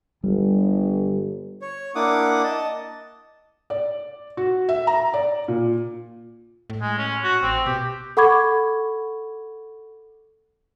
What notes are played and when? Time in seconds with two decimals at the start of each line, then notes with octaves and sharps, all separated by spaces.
0.24 G1 G3
1.62 C#5
1.95 A#3 D4 E4 F#5 D6 D#6
2.44 D#5 A5
3.70 D5
4.37 F#4
4.69 E5
4.87 A#5
5.14 D5
5.48 A#2
6.70 A2
6.82 G#3
6.98 C#4
7.24 F#4
7.43 A1 C4
7.66 B2 G4
8.17 A4 F#5 B5 C#6 D6 G#6